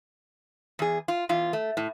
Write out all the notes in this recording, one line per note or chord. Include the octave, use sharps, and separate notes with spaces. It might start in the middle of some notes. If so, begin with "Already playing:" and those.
E2 G#4
F4
E2 F4
A3
A2